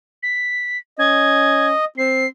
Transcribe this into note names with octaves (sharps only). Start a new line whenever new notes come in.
B6
C#4 D#5 G#6
C4 C7